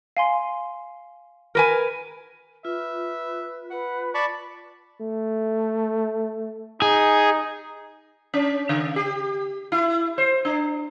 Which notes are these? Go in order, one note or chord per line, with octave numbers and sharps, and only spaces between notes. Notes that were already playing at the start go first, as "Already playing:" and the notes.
F5 G#5 C6
A#4 B4 G#5
F4 B4 E5
B4 F#5
D5 A5 B5 C#6
A3
D#4 G#4
C#4
C#3
G4
E4
C5
D4